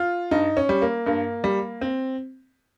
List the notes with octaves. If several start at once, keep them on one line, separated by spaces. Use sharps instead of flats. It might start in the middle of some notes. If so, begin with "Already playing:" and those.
Already playing: F4
G2 D#4
C#4
G3
A#3
G2 A#3
G3
C4